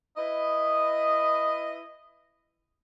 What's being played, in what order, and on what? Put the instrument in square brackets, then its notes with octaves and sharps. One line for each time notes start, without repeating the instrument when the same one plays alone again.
[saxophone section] E4 B4 D#5